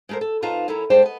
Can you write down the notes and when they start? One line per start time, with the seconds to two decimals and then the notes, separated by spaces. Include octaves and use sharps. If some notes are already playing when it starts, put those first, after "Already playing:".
0.09 G#3 A3 G#4 A#4 C5
0.21 A4
0.42 F2 D#4 F4 B4 A5 A#5
0.68 F#2 C#4 E4 A4 A#5
0.90 G2 G#3 C5 D5 G5 A5
1.02 B3 D#5